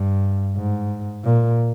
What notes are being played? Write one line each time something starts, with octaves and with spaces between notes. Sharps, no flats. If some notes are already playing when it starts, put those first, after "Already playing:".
Already playing: G2
G#2
A#2